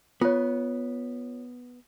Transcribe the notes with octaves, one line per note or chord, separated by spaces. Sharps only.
B3 F4 C#5